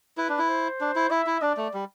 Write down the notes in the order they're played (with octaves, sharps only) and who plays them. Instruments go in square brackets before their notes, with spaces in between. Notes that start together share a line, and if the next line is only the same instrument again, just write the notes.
[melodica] E4 [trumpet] B4
[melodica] D4
E4
[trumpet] C5
[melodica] D4
E4
[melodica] E4 [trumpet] E5
[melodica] E4
[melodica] D4 [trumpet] D5
[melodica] A3
G3